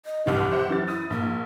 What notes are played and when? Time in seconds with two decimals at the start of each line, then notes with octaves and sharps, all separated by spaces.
0.06 D#5
0.26 F1 C2 E3 G4
0.51 C5 E5 F#5
0.68 F#2 E3 A6
0.88 E4 D#6
1.10 A#1 A#3